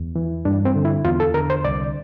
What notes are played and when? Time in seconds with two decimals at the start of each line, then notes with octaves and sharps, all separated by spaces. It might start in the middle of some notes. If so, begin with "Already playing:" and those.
Already playing: E2
0.16 E3
0.45 G2 D4
0.65 C4
0.76 D3
0.85 E4
1.05 E2 F4
1.20 A4
1.34 D3 A#4
1.50 C5
1.65 C2 D5